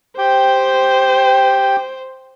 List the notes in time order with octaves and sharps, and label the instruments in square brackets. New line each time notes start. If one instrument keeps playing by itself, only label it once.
[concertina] G4 G5 [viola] C5